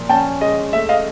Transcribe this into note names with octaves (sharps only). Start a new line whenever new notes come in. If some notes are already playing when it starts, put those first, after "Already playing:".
Already playing: A#2 F3
C#4 G5 A5
G#3 D#5
A3 E5
D#5 F5